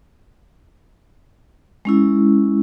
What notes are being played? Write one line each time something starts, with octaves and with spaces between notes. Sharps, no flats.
G#3 C#4 E4